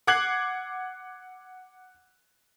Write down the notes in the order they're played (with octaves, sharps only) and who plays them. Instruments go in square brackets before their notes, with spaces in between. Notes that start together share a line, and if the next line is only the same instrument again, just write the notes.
[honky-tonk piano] F#5 D6 F#6 G#6 C7 F#7